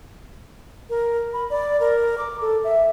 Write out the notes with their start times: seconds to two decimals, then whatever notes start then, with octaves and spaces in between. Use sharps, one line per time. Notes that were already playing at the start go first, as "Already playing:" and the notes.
0.90 A#4
1.33 B5
1.50 D5
1.80 A#4
2.18 D6
2.41 A4
2.64 E5